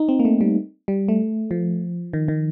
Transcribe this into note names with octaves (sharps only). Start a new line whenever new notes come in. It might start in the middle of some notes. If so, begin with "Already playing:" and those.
Already playing: D#4
C4
A#3
A3
G3
G3
A3
F3
D#3
D#3